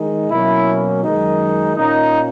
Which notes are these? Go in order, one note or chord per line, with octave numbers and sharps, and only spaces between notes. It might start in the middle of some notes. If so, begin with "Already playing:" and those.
Already playing: D#3 G#3 D#4
B2 F#3 A#3 C#4 E4
F#2 D#3 G#3 D#4
A#2 A#3 C#4 D#4